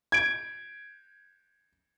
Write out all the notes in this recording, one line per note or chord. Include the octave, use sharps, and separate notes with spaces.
G#6 D7